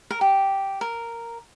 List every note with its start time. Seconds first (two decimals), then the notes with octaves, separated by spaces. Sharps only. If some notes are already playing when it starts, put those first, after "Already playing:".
0.11 A#4
0.21 G4
0.81 A#4